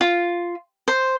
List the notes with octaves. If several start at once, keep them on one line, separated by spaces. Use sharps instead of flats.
F4
C5